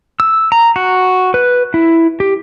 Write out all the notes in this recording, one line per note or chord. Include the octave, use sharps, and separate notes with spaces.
E6
A#5
F#4
B4
E4
G4